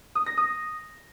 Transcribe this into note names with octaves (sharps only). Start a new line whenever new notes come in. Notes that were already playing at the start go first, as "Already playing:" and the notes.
D#6
A#6
D#6